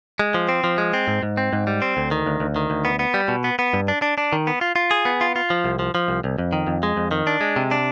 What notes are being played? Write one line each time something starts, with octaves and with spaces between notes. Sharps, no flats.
G#3
F3
C4
F3
G#3
C4
G#2
G#2
C4
G#2
G3
C4
D2
D#3
D2
D2
D#3
D2
B3
B3
G3
B2
B3
B3
G2
D4
D4
D4
D#3
B3
F4
F4
G#4
B3
F4
F4
F3
C2
F3
F3
C2
C2
F2
D#3
F2
G#3
F2
D#3
D4
G#3
C3
D4